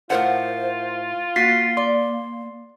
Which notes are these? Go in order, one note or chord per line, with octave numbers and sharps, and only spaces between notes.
A2 F4 A#4 C5 F#5
A#3 F#4 A6 B6 C7
D5 C6